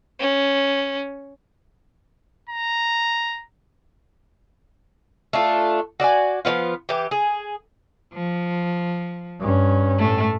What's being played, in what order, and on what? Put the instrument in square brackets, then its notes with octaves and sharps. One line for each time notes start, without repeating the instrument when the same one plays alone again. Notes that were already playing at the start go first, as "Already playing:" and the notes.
[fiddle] C#4
[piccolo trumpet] A#5
[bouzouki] A3 D4 F4
F#4 D5 E5 G#5
F3 F#3 B3 F4
E3 G4
G#4
[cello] F3
[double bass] G2 C#4
[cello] A2 A3